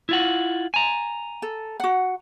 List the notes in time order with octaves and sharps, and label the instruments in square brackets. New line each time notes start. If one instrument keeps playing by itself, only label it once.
[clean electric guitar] E4 F4 F#5
G#5 A#5
[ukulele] A4
F#4 F#5